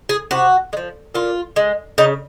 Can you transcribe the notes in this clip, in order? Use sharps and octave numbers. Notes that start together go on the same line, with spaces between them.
G#4
C3 F#4
G#3
F3
A#2 F4
G#3
C#3 D#4